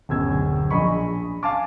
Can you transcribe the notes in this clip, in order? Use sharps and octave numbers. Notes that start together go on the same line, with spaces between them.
D1 F#2 B2 E6 G#6
A#1 G#4 D#5 B5 C#6
F5 G#5 A5 D6